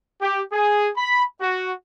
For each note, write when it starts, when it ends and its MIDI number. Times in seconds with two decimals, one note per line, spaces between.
0.21 0.41 67
0.52 0.89 68
0.96 1.23 83
1.41 1.71 66